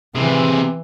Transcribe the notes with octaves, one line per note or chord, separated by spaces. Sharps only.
C3 E3 G#4